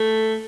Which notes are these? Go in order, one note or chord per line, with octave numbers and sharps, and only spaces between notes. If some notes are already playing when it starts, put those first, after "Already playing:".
Already playing: A3